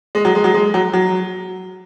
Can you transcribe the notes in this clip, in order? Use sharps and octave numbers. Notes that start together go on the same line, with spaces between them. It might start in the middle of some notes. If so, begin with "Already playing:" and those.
G#3
F#3
G#3
F#3
G#3
F#3
F#3